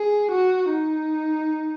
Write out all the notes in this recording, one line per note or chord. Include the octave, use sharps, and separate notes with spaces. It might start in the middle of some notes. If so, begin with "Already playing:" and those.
Already playing: G#4
F#4
D#4